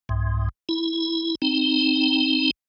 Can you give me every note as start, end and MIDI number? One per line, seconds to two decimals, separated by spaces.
0.09 0.49 36
0.09 0.49 44
0.69 1.35 64
1.42 2.51 60
1.42 2.51 63